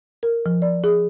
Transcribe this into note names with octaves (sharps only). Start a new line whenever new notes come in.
A#4
F3
D5
G#4